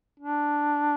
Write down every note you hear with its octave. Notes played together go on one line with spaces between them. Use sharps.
D4